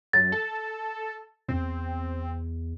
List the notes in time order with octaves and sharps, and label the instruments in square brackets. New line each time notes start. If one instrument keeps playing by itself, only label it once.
[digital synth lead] F#2 [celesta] A6
[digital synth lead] A4
[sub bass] E2 [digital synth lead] C4